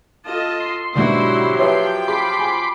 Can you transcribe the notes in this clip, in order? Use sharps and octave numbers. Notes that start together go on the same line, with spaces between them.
F4 A4 D#5 A5
C6
G#2 B2 D3 F#3 E4 F#4 G4 C5
F3 B4 C#5 E5 G5
G#4 B5 C6 D6
G#5